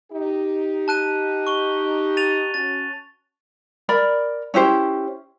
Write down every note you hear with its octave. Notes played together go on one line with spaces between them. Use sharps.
D#4 G4
A5 F#6 D#7
C#6 G7
A6 D#7 F7
C#4 F#4 A6
A#4 D5 B5
C#4 E4 G4 C5